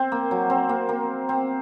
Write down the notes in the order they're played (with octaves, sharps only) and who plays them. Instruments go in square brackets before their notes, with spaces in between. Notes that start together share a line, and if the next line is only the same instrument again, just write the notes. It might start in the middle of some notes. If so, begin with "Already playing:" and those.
Already playing: [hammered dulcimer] C4
A#3
F#3
C4
A#3
A#3
C4